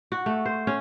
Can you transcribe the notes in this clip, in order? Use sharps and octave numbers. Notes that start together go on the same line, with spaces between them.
F#4
A3
C5
C#4